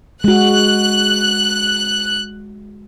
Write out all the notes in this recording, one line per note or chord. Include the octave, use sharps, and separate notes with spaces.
G#3 F#4 F#6